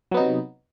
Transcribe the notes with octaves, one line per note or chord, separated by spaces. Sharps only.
C3 F#3 B3 D#4